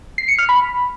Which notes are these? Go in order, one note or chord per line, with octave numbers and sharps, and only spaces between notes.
C7
C#7
F6
B5